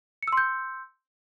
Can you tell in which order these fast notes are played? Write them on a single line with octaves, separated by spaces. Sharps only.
C#7 E6 C6 G6